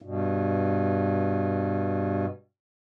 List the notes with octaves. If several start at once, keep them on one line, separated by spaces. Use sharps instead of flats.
G2 B2